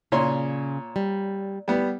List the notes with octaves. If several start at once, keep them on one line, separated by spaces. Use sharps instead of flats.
A#2 C#3 C#5 C6
G3
G3 B3